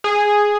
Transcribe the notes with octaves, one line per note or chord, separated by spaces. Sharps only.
G#4